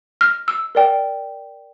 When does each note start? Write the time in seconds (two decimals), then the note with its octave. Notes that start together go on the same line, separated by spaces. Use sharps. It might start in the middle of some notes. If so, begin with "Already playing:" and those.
0.21 F6
0.48 E6
0.75 A#4 D5 G5